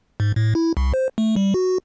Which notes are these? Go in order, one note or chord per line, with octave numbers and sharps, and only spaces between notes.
G#2
A2
E4
C2
C5
A3
G3
F#4